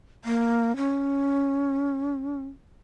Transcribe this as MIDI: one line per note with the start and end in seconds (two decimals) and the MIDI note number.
0.25 0.76 58
0.77 2.45 61